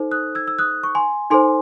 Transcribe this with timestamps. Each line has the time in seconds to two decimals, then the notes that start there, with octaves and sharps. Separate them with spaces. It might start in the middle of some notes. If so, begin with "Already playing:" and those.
Already playing: D#4 A4 C5
0.11 D#6 F#6
0.35 E6 G#6
0.48 E6
0.59 D#6 F#6
0.83 C#6
0.95 G#5 C6
1.30 D#4 A4 C5 G#5 C6